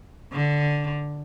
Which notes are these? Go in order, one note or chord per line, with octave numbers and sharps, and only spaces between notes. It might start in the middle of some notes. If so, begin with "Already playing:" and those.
D3